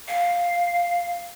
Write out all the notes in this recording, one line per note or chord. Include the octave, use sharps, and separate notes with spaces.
F5